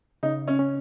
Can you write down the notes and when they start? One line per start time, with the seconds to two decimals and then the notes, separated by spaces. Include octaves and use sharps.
0.23 C#3 D#4
0.48 C#4
0.59 C#4